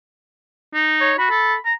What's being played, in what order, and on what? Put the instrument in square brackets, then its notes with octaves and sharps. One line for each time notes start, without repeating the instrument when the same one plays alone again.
[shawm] D#4
[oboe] C#5
[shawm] F#4 [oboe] B5
[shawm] A4
A#5